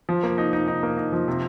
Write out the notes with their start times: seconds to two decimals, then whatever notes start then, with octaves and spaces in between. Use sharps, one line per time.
0.09 F3
0.23 A#3
0.38 D#4
0.53 D#4
0.68 D#4
0.83 A#3
0.97 D#4
1.13 F3
1.28 C3